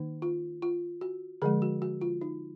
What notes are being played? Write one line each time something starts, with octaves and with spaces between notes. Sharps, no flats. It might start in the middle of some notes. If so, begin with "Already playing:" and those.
Already playing: D#3 A#3 D#4
F4
F4
F#4
D3 F3 G#3 G#4
F#4
F#4
F4
D#4